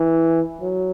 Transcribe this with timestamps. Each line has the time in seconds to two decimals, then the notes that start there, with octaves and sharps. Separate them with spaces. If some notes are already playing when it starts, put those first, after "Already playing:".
Already playing: E3
0.61 F#3